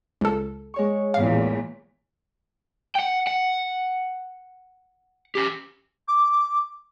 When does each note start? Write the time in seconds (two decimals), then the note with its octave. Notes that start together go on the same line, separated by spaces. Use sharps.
0.21 C#2 A4
0.74 G#3 C#5 C#6
1.14 A1 E2 A#2 F5
2.95 F#5 G5
3.27 F#5
5.35 C#4 G4
6.08 D6